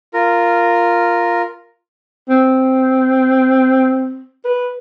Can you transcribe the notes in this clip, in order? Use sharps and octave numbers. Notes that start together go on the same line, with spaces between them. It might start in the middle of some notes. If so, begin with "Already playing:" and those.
F4 A#4
C4
B4